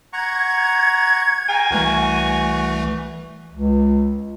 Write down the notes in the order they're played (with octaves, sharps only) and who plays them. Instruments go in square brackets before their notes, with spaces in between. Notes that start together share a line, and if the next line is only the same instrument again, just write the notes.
[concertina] F#5 A#5 C#6 [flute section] G#6
[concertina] F5 G5 A#5 [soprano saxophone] G#5
[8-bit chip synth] C2 E3 A3 [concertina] F#4
[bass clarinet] C#2